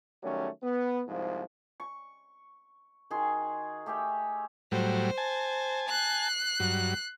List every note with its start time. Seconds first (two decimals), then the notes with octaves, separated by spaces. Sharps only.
0.23 D#3 F#3 G3 A3 C#4
0.62 B3
1.08 C2 G#2 F3
1.80 C#6
3.10 D#3 F#4 G#4 C6
3.86 A3 G4 G#4 G5
4.72 A2 F#3 G3 C5
5.18 G#5 A5
5.89 F#6 C7
6.60 G2 F#3